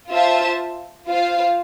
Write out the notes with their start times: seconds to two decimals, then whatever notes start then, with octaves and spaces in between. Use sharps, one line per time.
0.10 F4 C5 E5 A5
1.07 F4 C5 F5